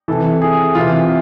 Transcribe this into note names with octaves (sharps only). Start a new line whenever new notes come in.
C3 E3 A4
G#4
C3 E3 F4